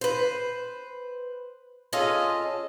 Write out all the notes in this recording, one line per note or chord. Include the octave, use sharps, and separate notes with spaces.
B4 C5
C#4 F4 G#4 A4 D#5